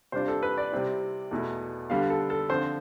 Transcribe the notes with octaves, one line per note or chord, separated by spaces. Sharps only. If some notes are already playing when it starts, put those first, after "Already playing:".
C3 G3 D4 F4 C5
A4
B4
D5
C3 G3 C4 E4
E2 B2 A3 E4
D3 G3 B3 F5
A4
A4
D3 F3 C4 F4 C5